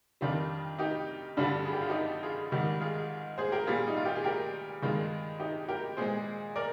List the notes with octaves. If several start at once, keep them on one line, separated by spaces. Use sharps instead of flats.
F2 D#3 G3 D4 F4
D#4 G4
G2 D3 G3 D4 F4
G#4
G4
F4
D#4 G4
F4 G#4
G#2 D#3 G3
F4 G#4
G#4 C5
G4 A#4
A#2 G3 F4 G#4
D#4
F4
G4
G#4
G4 A#4
G2 D#3 G#3 F4 G#4
D#4 G4
G4 A#4
A#2 G#3 G#4 C5
A#4 D5